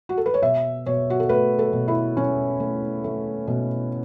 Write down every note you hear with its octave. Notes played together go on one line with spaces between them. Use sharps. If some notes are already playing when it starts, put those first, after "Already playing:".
F#4
A4
B4
C#5
B2 E5
B2 C#5
F#4
A4
A3 B4
A4
B2
E4
B2 C#4
A3
A3
B2